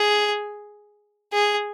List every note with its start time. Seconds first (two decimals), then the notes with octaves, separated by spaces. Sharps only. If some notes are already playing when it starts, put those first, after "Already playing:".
Already playing: G#4
1.33 G#4